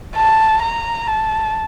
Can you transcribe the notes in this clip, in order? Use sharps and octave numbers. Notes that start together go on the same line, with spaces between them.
A5
A#5
A5